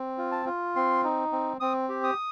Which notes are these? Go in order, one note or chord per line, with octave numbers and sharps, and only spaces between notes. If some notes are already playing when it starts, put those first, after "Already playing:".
Already playing: C4
F4
A5
F4
C4 C6
D#4
C4
C4 D#6
G4
D#6